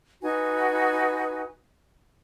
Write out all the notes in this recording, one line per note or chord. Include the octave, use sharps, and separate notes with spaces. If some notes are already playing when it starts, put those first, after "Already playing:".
D#4 F#4 B4 G#5